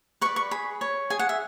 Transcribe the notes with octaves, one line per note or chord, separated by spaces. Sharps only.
B4 D5 C#6
C#6
G#4 B5
C#5
G#4 G#5
F#5
E5